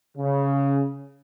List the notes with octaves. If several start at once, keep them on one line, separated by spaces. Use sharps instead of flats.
C#3